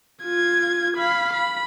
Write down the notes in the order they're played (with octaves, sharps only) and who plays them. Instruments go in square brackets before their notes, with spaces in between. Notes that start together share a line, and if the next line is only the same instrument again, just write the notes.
[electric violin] F4 G#6
F5 B5
B5